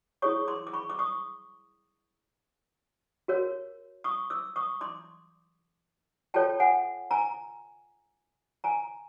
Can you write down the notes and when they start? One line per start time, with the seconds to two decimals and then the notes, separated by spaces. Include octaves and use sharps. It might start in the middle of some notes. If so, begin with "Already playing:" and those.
0.22 E4 G#4 C#5 C#6 D#6
0.48 C6 D6
0.67 D6
0.73 B5 C#6
0.90 D6
0.99 C#6 D#6
3.28 F#4 A#4 C#5
4.04 C#6 D#6
4.30 D6 E6
4.56 C#6 D#6
4.81 C6 D6
6.34 F4 A4 C#5 G5 A5
6.60 F#5 G#5
7.11 G#5 A#5
8.64 G#5 A#5